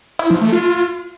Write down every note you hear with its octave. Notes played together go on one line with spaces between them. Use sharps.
E4
F3
A3
F4